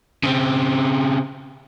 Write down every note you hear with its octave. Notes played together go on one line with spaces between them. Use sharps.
C#3 C4